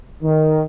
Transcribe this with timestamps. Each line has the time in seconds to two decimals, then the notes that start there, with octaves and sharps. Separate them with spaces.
0.23 D#3